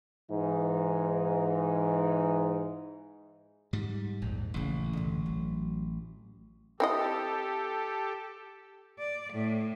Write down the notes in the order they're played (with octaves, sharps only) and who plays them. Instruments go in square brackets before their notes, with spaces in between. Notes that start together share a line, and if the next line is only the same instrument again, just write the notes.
[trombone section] G#2 E3 D#4
[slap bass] G#2 G3
[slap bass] A#1 [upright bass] E2 G#2
[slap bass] A1 [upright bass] A#2 C#3
[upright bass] G2 D3
F#3
[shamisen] C4 E4 D#5 [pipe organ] G4 A4
[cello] D5
A2